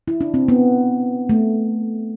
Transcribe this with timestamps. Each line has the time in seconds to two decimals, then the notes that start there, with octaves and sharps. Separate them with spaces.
0.08 E4
0.21 D4
0.34 C4
0.48 B3
1.29 A3